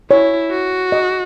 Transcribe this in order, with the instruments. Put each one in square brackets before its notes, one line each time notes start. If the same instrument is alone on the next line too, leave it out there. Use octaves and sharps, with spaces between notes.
[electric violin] E4 [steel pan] C#5
[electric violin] F#4
[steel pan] D#5